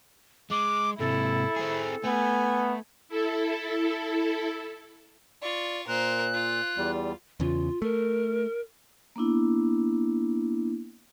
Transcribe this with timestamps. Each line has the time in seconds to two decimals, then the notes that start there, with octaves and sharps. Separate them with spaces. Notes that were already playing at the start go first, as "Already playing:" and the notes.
0.51 G#3 D6
0.99 G#2 C3 E4 A4
1.56 C4 G#4
2.05 A3 B3 G#5
3.09 E4 A4
5.42 F4 D5 C#6
5.88 A#2 A#4 C5 F#6
6.34 F4
6.77 E2 G3
7.40 E2 C#3 F4
7.82 A3 A#4
9.16 A#3 B3 D4 E4